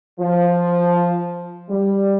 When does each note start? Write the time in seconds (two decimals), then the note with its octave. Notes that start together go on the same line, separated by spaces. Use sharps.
0.20 F3
1.70 G3